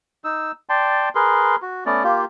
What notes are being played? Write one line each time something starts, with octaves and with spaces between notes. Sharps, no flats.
D#4 E6
D5 G5 A5 C6
G#4 A#4 B4 C6
F#4
A3 B3 C#4 D5
A#3 F4 G4